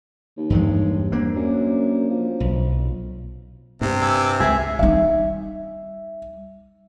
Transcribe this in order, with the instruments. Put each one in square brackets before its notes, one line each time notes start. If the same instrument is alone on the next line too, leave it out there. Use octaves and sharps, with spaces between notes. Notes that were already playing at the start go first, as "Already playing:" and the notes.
[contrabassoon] D#2
[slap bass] E2 G2 G#3
A#3 C4 D4
[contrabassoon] F#2
F3
[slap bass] B1
[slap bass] G2 [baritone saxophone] C3
[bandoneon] G#5 D6 E6
[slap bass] C#2 [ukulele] G#4 [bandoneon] E5
[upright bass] G3 D#4 [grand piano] E5